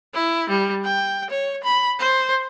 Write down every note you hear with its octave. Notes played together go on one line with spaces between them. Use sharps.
E4
G3
G5
C#5
B5
C5